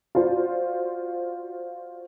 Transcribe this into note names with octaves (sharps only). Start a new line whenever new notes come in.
F4 F#4 C5 D5